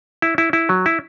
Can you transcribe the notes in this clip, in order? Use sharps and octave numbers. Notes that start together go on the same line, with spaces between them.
E4
E4
E4
F#3
E4